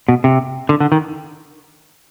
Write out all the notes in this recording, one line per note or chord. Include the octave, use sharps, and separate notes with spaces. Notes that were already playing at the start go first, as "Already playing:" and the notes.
B2
C3
D3
D3
D#3